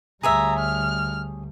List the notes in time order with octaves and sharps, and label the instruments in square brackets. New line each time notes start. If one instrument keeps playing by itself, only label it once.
[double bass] D2 G3 [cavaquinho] G#4 C#5 E5 [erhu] A#5
[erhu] F6